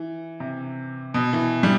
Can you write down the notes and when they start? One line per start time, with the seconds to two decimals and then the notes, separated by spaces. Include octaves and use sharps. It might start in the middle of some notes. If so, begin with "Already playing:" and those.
Already playing: E3
0.40 C3
1.14 B2
1.33 E3
1.63 G3